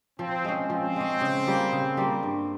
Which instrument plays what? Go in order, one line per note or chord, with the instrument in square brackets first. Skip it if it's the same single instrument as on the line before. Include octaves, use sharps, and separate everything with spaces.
[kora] F3 [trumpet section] C4
[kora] G#3 C#4
[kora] F3 [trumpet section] C4
[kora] G#3 C#4
C#3
G3 A#3 F4
C#3
G3 A#3 F4
G2